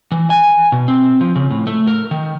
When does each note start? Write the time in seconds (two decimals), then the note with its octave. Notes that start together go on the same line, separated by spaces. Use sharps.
0.12 E3
0.30 G#5
0.72 B2
0.88 C4
1.21 F3
1.36 C#3
1.51 A2
1.67 A3
1.87 A#4
2.11 D#3